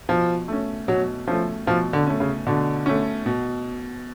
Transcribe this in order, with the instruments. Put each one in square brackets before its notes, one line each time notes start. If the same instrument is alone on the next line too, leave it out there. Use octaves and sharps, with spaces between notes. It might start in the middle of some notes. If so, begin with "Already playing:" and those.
[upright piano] B2 [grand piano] F3
[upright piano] A3 C#4
[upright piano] B2 [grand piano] F#3
[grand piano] F3 [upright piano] A3 C#4
[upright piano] B2 [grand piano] F3
[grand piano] D3
[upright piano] A3 C#4
[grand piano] C#3
[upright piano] B2 [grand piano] D3
[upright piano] A3 C#4
B2